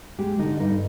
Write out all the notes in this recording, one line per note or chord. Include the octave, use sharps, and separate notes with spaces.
G#3 G4
D3 D#4
G2 D#4